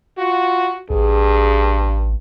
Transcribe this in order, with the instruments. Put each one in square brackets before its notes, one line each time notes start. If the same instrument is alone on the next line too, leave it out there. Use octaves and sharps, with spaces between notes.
[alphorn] F4 [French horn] F#4
[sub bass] A1 [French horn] G2 [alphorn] G#4